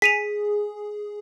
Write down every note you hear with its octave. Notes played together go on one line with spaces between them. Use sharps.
G#4 B6 D#7 F7